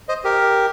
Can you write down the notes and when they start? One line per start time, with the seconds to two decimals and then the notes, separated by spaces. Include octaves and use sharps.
0.09 C5 D#5
0.24 G4 A#4